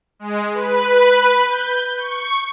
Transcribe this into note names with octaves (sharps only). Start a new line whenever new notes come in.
G#3
B4
G6
C#6